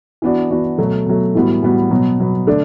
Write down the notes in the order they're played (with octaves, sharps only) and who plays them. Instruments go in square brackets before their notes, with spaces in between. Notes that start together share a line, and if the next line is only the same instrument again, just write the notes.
[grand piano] E3 B3 D4 F#4
E3 B3 D4 F#4
B2 F#3 A3
B2 F#3 A3
A2 E3 G3 B3 F#4
A2 E3 G3 B3 F#4
B2 F#3 B3
B2 F#3 B3
D3 A3 D4